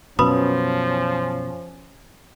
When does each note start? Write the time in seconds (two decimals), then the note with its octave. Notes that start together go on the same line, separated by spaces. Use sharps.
0.19 F#2 B2 F3 C#4 B4 B5 D#6